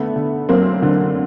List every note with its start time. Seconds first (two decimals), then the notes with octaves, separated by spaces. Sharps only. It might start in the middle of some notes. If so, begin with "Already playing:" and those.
Already playing: D3 A3 B3
0.16 D3
0.49 F#2 A#3 C4
0.82 D3